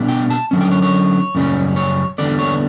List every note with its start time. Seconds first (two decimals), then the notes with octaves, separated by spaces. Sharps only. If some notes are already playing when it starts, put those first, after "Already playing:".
Already playing: B2 G3 D4
0.08 G5
0.30 A5
0.51 D3 F#3 C#4
0.61 G5
0.71 C#5
0.82 C#5
1.35 F#2 C#3 G3 C#4
1.76 C#5
2.18 E2 D3 G3 D5
2.39 C#5